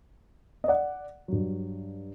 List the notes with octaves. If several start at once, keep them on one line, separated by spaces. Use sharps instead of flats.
D#5
D5 F#5
G2 F#3